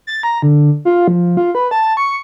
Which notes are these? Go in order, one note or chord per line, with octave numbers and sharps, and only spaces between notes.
A6
A#5
D3
F4
F3
F4
B4
A5
C#6